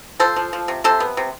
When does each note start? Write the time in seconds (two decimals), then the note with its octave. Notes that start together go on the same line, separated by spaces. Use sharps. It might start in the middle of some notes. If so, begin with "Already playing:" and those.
0.19 F3 A4 C5
0.36 F3
0.53 F3
0.68 C3
0.84 C3 A4 C5
1.00 B3
1.17 C3